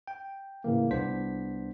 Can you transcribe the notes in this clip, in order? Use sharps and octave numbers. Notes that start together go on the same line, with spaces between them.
G5
A2 C#3 E3 A#3
C2 B3 D4 C5 B6